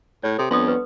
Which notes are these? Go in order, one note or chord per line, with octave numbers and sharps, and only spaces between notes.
A2 C#5
C3 A4
F2 B3 D4 C#5 C6 D#6
B4